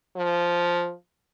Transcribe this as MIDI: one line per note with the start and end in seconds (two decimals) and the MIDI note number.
0.16 0.92 53